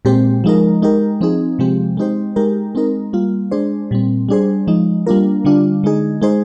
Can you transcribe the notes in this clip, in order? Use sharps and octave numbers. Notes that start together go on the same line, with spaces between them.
A#2 G#3 C4 G4 C5
F3 G#3 D#4 A#4
G#3 D#4 G4 A#4
F3 C4 D#4 G#4
C3 F3 G#3 C4 G4
G#3 C4 D#4 G4 C5
G#3 D#4 G4 A#4
G#3 C4 D#4 A#4
G3 A#3 F4
G#3 D4 G#4 C5
A#2 G3 C4
G3 D4 G#4 C5
F3 G#3 D#4
G3 A#3 D4 F4 A#4
D3 G3 D4 F4
D3 G#3 D#4 G#4
G#3 D#4 G#4 C5